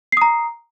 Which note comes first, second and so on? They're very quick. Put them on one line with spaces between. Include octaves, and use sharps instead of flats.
C7 D#6 A#5